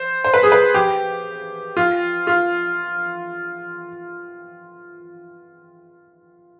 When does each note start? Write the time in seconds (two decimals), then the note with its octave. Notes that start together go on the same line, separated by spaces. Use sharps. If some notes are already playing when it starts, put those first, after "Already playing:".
Already playing: C5
0.24 C5
0.34 B4
0.43 G#4
0.52 B4
0.74 G4
1.77 F4
2.27 F4